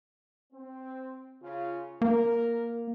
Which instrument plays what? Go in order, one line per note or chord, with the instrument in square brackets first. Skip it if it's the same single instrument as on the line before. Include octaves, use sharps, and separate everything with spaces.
[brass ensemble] C4
C#3 F4
[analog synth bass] A#3 [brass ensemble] A#4